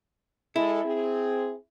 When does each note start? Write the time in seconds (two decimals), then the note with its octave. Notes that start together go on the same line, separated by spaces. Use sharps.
0.56 G#3 E4 A4
0.85 C4 G#4